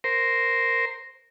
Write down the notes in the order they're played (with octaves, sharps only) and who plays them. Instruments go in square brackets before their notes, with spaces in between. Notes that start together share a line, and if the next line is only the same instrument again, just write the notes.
[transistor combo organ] A#4 C5